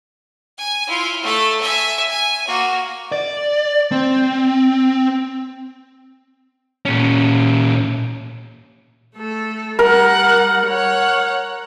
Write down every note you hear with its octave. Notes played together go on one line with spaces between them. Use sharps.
G#5
E4 F4
A3 A4
E5 G#5
G#5
A#3 F#4
D5
C4
A#2 C#4
A3 A4
G3 A#4 F#5
C#5 F#5